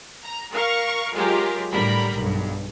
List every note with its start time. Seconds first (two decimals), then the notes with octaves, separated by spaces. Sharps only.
0.23 A#5
0.53 A#4 F5 C#6
1.13 F#3 G#3 F4 G4 A#4
1.72 A2 D3 G3 A#4 B5
2.14 B1 G2